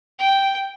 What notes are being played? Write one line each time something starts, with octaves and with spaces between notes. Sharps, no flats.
G5